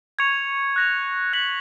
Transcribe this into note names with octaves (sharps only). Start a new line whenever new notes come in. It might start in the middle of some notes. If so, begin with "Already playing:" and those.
C#6 G#6 C#7 F7
F#6 A#6 F7
F#6 B6 F#7